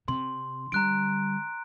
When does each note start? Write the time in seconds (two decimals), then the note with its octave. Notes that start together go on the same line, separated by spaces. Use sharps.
0.08 C3 C6
0.72 D3 G3 A#5 F#6 D7